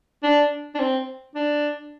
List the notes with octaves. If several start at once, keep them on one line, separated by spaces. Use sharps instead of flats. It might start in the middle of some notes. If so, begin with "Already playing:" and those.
D4
D4
C4
D4